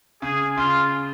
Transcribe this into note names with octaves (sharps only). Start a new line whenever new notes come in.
C#3 G#4
C#3 F4